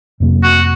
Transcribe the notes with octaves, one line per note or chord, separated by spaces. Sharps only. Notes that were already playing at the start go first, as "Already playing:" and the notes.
F2 C3 F#3 A#3
F#4